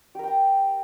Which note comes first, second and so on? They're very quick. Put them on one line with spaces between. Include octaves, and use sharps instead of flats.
G4 A#4 G5 A#5